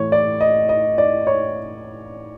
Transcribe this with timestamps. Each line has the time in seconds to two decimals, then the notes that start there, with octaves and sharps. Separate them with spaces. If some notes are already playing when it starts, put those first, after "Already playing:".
Already playing: A2 E3 C#5
0.12 D5
0.41 D#5
0.69 D#5
0.98 D5
1.27 C#5